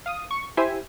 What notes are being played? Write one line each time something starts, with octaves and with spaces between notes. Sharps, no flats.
F5 D#6
C#6
E4 G4 C5 E5 G#5